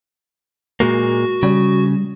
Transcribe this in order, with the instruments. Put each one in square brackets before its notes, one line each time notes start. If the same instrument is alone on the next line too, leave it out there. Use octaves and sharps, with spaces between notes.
[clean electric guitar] A#2 G#3 A#3 [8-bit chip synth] F#4
[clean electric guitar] C#3 [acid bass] G3